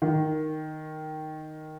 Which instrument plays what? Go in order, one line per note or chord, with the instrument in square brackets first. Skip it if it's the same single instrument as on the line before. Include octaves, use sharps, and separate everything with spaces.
[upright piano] D#3